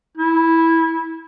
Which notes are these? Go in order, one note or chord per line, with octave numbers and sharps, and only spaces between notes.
E4